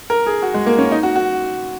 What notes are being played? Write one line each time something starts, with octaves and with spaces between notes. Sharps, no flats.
A#4
G#4
F#4
G#3
A#3
C#4
D#4
F#4
F#4